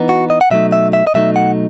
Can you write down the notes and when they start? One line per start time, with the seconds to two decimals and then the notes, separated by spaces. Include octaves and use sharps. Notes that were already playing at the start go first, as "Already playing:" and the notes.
Already playing: E3 B3 D#4
0.09 F#4
0.30 D#5
0.41 F#5
0.50 B2 F#3 A3 D#4 E5
0.72 E5
0.93 E5
1.07 D#5
1.14 B2 F#3 A3 D#4 E5
1.36 F#5